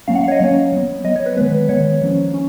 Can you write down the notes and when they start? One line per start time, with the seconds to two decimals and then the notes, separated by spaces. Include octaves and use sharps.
0.08 F#3 A#3 C#4 F5
0.15 F#5
0.24 F5
0.28 C#5
0.32 D#5
0.40 F#3 A#3 C#4 C#5
0.73 F#3 B3
1.04 F#3 B3 D#5
1.16 C#5
1.26 B4
1.37 D#3 G#3 B3 B4
1.69 D#3 G#3 B3 C#5
2.02 F3 A#3 C#4
2.34 C#4